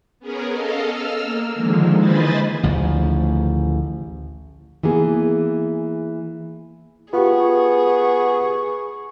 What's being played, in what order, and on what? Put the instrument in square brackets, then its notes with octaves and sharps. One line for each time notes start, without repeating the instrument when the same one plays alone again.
[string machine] B3 C#4 G#4 A#4
A4 D#5 F5
E6 F6
A#3
D3 D#3 F3 G#3
E3 C5 D#5 G#5 B5 A6
[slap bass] A1 D2 C#3 F3
[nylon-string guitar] E3 A#3 B3 G#4
[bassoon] B3 [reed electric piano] F4 G4 [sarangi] G#4 [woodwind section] C#6